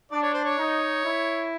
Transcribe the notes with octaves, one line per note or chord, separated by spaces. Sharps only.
D4 D5
C#5
C5
C#5
D#4
E4